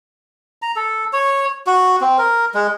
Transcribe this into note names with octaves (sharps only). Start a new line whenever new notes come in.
A#5
A4
C#5
F#4
C4
A#4
G#3